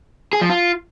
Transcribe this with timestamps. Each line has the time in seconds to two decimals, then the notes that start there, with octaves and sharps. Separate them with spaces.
0.33 G#4
0.41 F3
0.50 F4